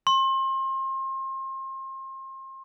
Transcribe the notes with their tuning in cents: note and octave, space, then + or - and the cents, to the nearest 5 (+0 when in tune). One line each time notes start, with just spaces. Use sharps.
C6 +35